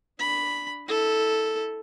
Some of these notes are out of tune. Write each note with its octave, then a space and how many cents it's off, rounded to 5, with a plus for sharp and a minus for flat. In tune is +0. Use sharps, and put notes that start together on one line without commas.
D4 +0 B5 +0
E4 -25 A4 +0